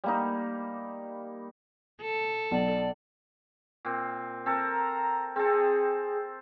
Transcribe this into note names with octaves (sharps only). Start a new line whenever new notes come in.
G3 A#3 D#4
A4
B1 D5
A#2 C4
C4 A4 A#4
A#5
C4 G#4 A4